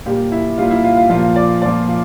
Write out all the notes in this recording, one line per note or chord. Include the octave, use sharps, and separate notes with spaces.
A#2 G3 G4
E4
A#2 G3 F4
E4
F4
F4
A#2 F3 F4
D5
A#2 F3 D5
F4